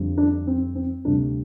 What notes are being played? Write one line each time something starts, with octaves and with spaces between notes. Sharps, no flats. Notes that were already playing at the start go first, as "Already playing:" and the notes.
Already playing: F2 D3 G3
D4
C4
C4
D2 C3 G3 D4